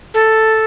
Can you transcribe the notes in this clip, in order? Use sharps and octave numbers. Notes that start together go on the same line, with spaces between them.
A4